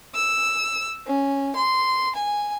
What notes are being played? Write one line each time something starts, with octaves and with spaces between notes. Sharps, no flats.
E6
C#4
C6
G#5